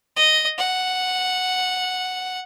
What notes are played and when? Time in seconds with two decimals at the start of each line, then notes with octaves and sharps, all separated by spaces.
0.16 D#5
0.58 F#5